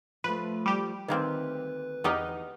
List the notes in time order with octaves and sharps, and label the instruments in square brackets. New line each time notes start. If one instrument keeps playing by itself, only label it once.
[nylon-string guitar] F3 A3 [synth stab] B4
[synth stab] G3 G4
[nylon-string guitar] D2 [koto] D#3 A#3 C4 [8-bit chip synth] B4
[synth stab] E2 D#4 [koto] B3 G4 A#4